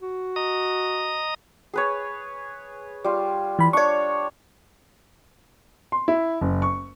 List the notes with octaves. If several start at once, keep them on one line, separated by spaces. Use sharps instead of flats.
F#4
D#5 A#5 D#6
G#4 B4 C#5
G3 F4
E3 B5
D4 C#5 D5 C#6
C6
E4
F#1
C#6